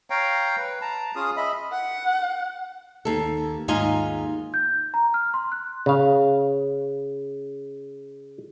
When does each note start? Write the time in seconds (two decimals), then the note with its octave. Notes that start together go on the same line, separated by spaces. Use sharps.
0.10 C#5 F5 G5 A#5
0.57 B4
0.82 A5 A#5
1.16 C#4 F4 G#4 D#6
1.37 D#5 E5 B5
1.72 F#5
3.05 D#2 A4
3.68 D#2 G#2 D#4 F4 G#5
4.54 G6
4.94 A#5
5.14 F6
5.34 C6
5.52 F#6
5.86 C#3 F5